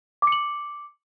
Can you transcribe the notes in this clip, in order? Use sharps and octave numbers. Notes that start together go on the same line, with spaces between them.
D6 C#7 F#7